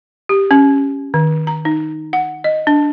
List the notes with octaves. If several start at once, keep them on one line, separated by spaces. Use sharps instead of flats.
G4
C#4
D#3
A#5
D#4
F#5
D#5
D4